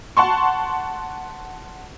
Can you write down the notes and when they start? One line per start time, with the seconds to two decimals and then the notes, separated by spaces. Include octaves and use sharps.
0.17 F#5 A5 C6 C#6